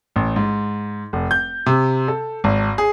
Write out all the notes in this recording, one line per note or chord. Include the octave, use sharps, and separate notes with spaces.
A1
G#2
F1
G6
C3
A4
G#1
G#4